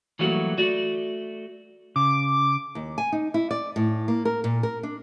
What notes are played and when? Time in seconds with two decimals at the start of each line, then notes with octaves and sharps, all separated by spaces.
0.19 E3 F#3 G3 A3 A#3 F#4
0.57 A3 F#4 D5
1.96 C#3 D6
2.75 D#2
2.98 G#5
3.12 D#4
3.34 E4
3.51 D5
3.76 A2
4.08 A#3
4.25 A#4
4.44 A#2
4.63 A#4
4.83 D4